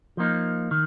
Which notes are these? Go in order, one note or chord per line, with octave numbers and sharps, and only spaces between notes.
F3 A#3 D#4
D#3